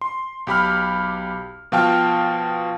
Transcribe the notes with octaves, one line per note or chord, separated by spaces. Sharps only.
C6
B1 G4 B5 F6
B2 F3 F5 G5 A5 F6